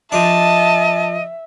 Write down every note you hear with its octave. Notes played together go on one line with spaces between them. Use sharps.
F3 D4 D#5 E5 A5